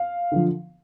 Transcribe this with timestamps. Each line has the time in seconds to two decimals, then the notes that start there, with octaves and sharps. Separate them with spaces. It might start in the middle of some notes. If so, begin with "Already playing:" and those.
Already playing: F5
0.32 D3 F3